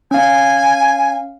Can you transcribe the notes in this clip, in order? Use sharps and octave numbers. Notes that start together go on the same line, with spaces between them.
C#4 F5 G#5